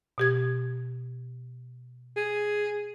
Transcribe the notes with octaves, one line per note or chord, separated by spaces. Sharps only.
B2 G4 G#6
G#4